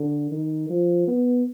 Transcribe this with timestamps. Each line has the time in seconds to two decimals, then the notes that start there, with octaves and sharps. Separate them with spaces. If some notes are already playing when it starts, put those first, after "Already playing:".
Already playing: D3
0.32 D#3
0.70 F3
1.08 B3